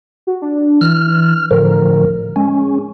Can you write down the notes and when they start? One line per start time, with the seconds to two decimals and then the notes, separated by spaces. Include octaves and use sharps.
0.27 F#4
0.42 D4
0.81 E3 F6
1.51 A2 D3 F3 A#4
2.36 G#3 C#4